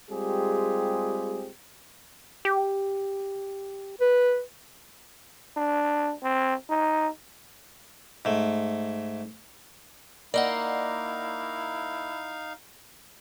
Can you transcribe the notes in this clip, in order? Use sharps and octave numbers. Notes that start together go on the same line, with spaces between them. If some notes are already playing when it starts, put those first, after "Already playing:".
G3 G#3 C4 F4 G4 G#4
G4
B4
D4
C4
D#4
G#2 A3
A#3 D#4 E4 D5 D#5 F5 F#5